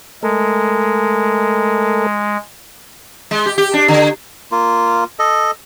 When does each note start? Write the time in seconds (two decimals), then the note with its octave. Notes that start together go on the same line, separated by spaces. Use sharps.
0.23 G#3 A3 A4 A#4
3.31 G#3
3.46 G4
3.58 G4
3.74 D4
3.88 D3
4.52 A#3 F4
5.19 A4 D#5